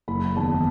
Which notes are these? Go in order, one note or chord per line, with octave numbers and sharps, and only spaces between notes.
F#1 B5
E2 D#3 A5